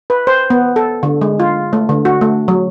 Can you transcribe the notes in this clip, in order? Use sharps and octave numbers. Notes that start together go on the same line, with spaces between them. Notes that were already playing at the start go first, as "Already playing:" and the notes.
B4
C5
B3
A4
D3
G#3
F4
A3
D3
F#4
A3
F#3